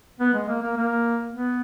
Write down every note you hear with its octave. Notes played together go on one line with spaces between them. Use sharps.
B3
G#3
A#3
A#3
A#3
B3